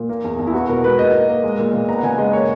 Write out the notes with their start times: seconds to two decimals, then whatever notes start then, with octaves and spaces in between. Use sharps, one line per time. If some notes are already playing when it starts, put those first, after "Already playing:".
Already playing: A#2
0.09 A#3
0.24 E2
0.39 E2
0.47 E4
0.53 B3 F#4
0.69 B2 A#4
0.84 G#3 B4
0.99 A#3 D#5
1.13 A#3
1.29 A#3
1.44 G#3
1.59 A#2
1.74 A#2
1.88 B3 A#5
1.99 F#5
2.03 C#3 G#5
2.18 G#3 D#5
2.33 A#3 C#5